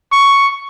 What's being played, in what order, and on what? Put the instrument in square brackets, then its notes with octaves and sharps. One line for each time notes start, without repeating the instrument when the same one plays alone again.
[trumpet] C#6